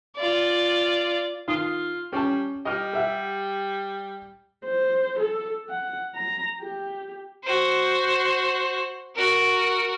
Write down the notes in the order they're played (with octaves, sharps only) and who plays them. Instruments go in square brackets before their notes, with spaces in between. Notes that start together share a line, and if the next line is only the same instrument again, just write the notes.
[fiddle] F4 D5
[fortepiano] D#3 D#6 [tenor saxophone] F4
[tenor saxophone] G3 [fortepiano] C#4 A5
[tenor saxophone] G3 [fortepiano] D#5 F6
[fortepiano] G4 E5 F#5
[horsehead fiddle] C5
A4
F#5
A#5
G4
[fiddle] F#4 C5
F#4 A#4